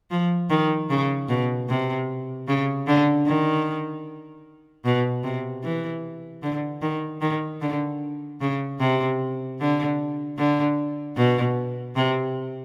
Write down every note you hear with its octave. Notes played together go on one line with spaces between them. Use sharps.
F3
D#3
C#3
B2
C3
C#3
D3
D#3
B2
C3
E3
D3
D#3
D#3
D3
C#3
C3
D3
D3
B2
C3